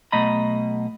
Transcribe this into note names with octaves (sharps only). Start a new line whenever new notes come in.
B1 B2 A3 D#5 A#5 B5